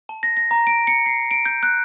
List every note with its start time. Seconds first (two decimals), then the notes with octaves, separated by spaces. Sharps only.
0.09 A5
0.23 A#6
0.37 A#6
0.51 A#5
0.67 D7
0.87 C#7
1.06 C7
1.31 D7
1.46 G6
1.63 F#6